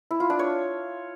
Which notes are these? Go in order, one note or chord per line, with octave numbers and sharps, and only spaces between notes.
E4
F4
D4
C#5